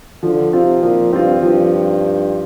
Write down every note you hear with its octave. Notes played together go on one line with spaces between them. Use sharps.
D3 F3
C3 C4 F4
A#2 F3
G2 C4 F4
G2 F3
F4